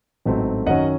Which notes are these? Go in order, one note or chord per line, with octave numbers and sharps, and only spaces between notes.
A1 G#2 F#3 A3 C4
F#2 D#3 F#3 C#4 D#5 F#5